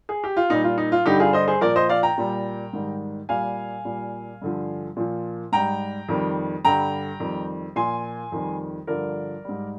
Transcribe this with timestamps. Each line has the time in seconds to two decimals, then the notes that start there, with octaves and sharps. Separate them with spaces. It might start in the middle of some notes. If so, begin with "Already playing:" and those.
0.09 G#4
0.24 G4
0.37 F4
0.50 A#2 G3 D#4
0.64 F4
0.78 D#4
0.92 F4
1.06 G2 D3 G3 D#4 G4
1.20 F4 G#4
1.33 C5 D#5
1.48 G#4 C5
1.61 A#2 F3 A#4 D5
1.76 C5 D#5
1.89 D5 F5
2.03 G5 A#5
2.18 A#2 G3
2.73 G#2 D#3 G3
3.29 A#2 G3 F5 G#5
3.85 A#2 G3
4.42 G2 D3 F3
4.97 A#2 F3
5.52 G#2 G3 G5 A#5
6.08 F2 D#3 G3
6.64 G2 D3 G3 G5 A#5
7.20 F2 D#3 G3
7.76 A#2 F3 G#5 C6
8.32 F2 D#3 G3
8.87 G2 D3 F3 A#4 D5
9.44 G#2 G3